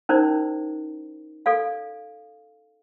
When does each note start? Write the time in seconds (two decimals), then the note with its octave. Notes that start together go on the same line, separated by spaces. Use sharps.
0.09 C#4 D#4 E4 A#4 C5 D5
1.46 A4 D5 F5